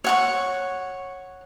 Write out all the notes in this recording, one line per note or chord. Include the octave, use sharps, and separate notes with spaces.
C#5 F#5 C#6